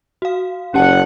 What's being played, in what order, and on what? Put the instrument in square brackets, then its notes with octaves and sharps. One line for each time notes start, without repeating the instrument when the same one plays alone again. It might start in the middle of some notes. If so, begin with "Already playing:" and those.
[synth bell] F#4 F5
[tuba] F#1 [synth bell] C#4 G4 A5 [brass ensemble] F#5